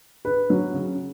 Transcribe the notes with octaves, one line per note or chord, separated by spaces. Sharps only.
B4
F#3
C#3